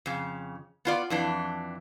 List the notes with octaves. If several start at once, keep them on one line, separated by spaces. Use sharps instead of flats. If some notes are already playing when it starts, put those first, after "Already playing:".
F2 C#3
B3 F4 D5
F2 E3 D4